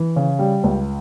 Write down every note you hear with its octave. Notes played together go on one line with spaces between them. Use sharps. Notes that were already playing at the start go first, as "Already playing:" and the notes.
Already playing: E3
C#3
G3
C#2